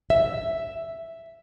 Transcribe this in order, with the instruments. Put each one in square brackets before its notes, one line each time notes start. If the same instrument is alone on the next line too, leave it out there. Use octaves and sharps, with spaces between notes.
[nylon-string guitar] E5